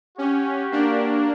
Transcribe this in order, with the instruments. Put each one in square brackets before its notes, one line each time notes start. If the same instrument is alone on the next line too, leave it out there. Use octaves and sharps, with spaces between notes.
[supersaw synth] C#4 [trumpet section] F#4 G4
[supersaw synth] A#3 D4